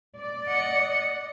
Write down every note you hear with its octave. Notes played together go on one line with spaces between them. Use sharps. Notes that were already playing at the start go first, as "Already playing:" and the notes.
D5
D#5 F#5